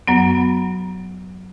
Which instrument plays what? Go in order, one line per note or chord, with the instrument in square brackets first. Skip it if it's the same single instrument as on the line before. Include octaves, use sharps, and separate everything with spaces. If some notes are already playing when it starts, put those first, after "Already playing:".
[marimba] F#2 F#3 B3